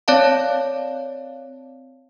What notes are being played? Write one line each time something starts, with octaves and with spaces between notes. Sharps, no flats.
C4 C#5 D5 F5 A5